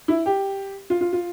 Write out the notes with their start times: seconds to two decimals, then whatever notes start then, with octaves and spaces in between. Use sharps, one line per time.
0.08 E4
0.26 G4
0.90 F4
1.01 F4
1.13 F4